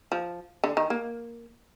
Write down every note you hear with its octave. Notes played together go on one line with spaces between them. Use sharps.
F3
D3
D#3
A#3